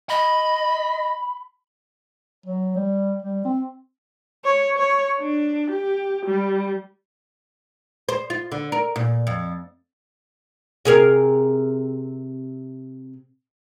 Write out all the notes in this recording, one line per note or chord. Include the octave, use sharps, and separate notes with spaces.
D#5 B5
F#3
G3
G3
C4
C#5
C#5
D4
G4
G3
C5
F4
D3
A#4
A#2
F2
C3 G#4 A#4